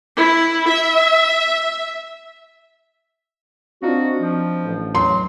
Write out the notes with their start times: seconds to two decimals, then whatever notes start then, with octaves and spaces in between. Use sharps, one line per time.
0.16 E4
0.68 E5
3.83 C4 D4 D#4 F4 F#4
4.20 F3
4.64 A1
4.95 F#3 C6